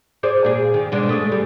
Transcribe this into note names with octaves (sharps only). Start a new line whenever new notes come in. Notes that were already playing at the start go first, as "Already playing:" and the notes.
G#4 C5 D5
A#2 G#4
D#3
B2 G#3 D4
A3 G#4
G3